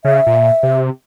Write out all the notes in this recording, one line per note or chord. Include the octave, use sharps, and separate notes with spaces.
C#3 E5
A#2
C3